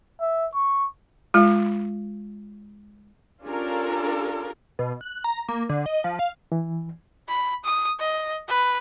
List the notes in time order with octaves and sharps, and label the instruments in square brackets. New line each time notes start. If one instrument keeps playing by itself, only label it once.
[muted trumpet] E5
C#6
[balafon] G#3 F4
[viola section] C#4 D4 F4 G4 A4 A#4
[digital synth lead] B2
F#6
A#5
A#3
D3
D#5
F3
F5
[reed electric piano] E3
[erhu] B5
D#6
D#5
B4